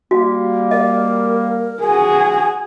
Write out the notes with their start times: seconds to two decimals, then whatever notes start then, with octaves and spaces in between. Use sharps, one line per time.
0.11 G3 A#3 F#4
0.71 A#4 D#5
1.82 F#4 G#4 G#5